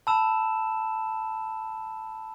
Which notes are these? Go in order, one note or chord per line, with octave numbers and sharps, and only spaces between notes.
A5 B5 E6 E7